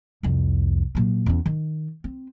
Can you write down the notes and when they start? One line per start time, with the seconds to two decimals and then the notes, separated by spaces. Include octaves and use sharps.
0.23 C2 F2
0.95 A#2 F#3
1.26 E2 C#4
1.46 D#3
2.04 C4